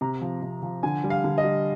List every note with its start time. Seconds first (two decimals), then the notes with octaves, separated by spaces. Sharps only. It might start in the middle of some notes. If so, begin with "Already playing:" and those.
0.01 C3 A#5
0.21 F3
0.42 C3
0.63 F3
0.83 D3 G#5
1.04 G3
1.10 F5
1.24 D3
1.38 D#5
1.44 G3